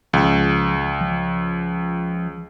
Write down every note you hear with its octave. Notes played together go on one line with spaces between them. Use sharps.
C#2 F3
F3